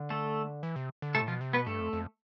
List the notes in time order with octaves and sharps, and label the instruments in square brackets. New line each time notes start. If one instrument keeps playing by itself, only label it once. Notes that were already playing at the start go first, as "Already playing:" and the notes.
Already playing: [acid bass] D3
[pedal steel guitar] A3 A4
[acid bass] E3
C3
D3
[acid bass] C3 [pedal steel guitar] A3 A4
[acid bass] A2
[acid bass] B2 [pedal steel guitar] F3 F4
[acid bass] C3
[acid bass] B2 [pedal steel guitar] B3 B4
[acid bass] G2 [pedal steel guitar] A3 A4
[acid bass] F2
F2